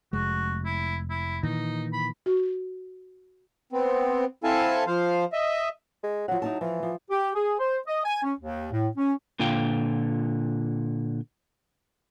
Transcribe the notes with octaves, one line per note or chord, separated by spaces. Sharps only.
F1 G#3 F#4
E4
E4
A#2 D#3 E3 D#4
B5
F#4
B3 C4
C4 E4 A4 F5 G#5 A5
F3 C5 F5
D#5 E5
G#3
F3 F#3 F#5
D#4 E4 A5
E3 F3
F3
G4
G#4
C5
D#5
G#5
C#4
D#2
A2
C#4
A#2 D3 F4 G5